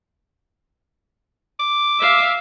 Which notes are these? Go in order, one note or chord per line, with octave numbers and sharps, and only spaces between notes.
D6
E5 F5